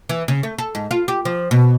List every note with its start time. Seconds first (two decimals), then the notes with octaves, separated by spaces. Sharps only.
0.09 E3
0.28 C#3
0.43 A3
0.58 A4
0.75 G#2
0.91 F4
1.08 G4
1.25 F3
1.51 B2